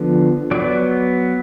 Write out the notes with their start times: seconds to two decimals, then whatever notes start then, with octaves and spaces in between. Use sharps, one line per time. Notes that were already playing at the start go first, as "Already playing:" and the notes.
Already playing: D3 F3 B3
0.51 F#3 B3 D5